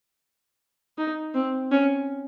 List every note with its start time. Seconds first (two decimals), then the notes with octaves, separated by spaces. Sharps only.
0.98 D#4
1.34 C4
1.71 C#4